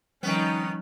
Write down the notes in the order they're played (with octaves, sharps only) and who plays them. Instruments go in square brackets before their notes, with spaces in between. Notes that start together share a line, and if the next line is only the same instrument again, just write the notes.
[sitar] D#3 B3 [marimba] F3 G3 [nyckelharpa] C#4 D#4